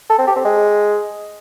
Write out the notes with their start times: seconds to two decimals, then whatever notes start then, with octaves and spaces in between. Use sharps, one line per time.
0.10 A4
0.18 C4
0.27 G4
0.36 C4
0.45 G#3